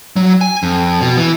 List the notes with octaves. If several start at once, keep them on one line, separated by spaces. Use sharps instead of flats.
F#3
G#5
F2
B2
E3